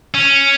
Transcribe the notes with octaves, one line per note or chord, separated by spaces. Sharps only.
C#4